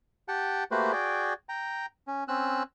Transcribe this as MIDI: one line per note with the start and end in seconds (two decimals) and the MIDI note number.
0.28 0.64 67
0.28 0.64 78
0.28 0.64 79
0.28 0.64 81
0.71 0.92 57
0.71 0.92 58
0.71 0.92 66
0.71 0.92 67
0.71 0.92 71
0.71 0.92 72
0.92 1.34 66
0.92 1.34 68
0.92 1.34 74
0.92 1.34 79
1.49 1.86 79
1.49 1.86 82
2.07 2.24 61
2.28 2.63 60
2.28 2.63 61
2.28 2.63 88
2.28 2.63 90